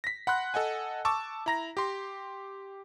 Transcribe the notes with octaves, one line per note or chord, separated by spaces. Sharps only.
A#6 B6
F#5 B5 C6 F#6
A4 D#5 F#5 G#5
A5 C#6 D6 E6
E4 A#5 A#6
G4 C6